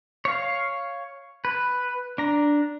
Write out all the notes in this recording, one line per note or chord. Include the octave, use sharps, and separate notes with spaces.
C#5 F5
B4
D4 A#5